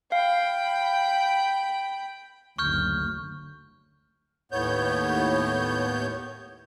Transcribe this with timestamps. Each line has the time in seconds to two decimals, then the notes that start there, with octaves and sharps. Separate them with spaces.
0.12 F5 G5 B5
2.58 F#1 D2 C#6 F6 G6
4.52 D#2 A2 B3 C#5 G6